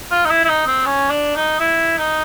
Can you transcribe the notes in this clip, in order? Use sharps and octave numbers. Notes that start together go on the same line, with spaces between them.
F4
D#4
E4
E4
D#4
C4
C#4
D4
D#4
E4
D#4